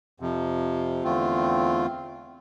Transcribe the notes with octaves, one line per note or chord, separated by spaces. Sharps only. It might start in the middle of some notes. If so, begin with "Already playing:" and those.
F2 C3 F3
E2 D3 A3 C4 F4